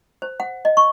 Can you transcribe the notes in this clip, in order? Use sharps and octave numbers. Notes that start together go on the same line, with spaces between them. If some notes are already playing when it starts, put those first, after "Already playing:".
C5
F#5
D#5
C#6